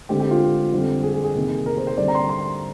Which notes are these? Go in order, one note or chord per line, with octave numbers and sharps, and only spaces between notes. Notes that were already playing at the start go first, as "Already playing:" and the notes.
D3 G#3 C4 G4
G4
F4
G4
F2 D3 G3 C4
G#4
G#4
G#4
C3 D#3 A#3
A#4
C5
C5
D3 G3 C4 D5
A#5
C6
A#5
C6